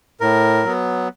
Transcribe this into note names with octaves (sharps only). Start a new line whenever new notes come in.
A2 A#4
F#3 B3